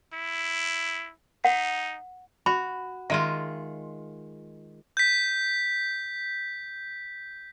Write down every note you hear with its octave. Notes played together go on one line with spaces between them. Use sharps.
E4
D#4 F#5
F#4 B5
D#3 G#3 F4 E5
G6 B6